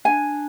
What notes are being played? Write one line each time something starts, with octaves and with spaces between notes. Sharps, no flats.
D4 G#5